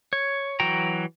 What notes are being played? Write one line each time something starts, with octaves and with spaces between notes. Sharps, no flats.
C#5
E3 F#3 F#4 G5 A#5